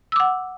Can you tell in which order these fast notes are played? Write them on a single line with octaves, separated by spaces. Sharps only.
E6 D6 F#5